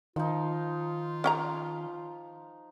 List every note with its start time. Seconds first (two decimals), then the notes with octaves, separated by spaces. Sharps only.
0.16 D#3 F3 D#4 F4
1.24 C#4 G5 A#5